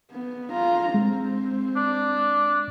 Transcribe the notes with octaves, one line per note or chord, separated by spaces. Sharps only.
B3
F4 A#5
G#3 C4
D4